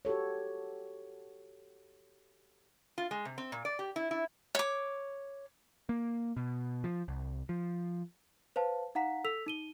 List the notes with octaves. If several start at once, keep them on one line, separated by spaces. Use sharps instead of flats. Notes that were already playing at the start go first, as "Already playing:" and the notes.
F#4 G4 A4 C#5
F4
G#3
C3
C4
A#2
D5
G4
E4
E4
C#5 D6
A#3
B2
F3
C2
F3
B4 C5 F5 A5
D#4 F5 F#5 A#5 B6
A4 E6 B6 F7
D#4 D#7 G7